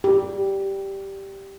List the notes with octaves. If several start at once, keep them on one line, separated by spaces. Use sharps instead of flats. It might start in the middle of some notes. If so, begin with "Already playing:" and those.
G4